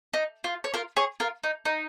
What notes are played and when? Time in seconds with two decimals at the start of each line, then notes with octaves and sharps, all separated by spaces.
0.13 D#4
0.44 F4
0.64 C#5
0.74 F4 A#4
0.96 G#4 C#5
1.20 F4 A#4
1.43 D#4
1.65 D#4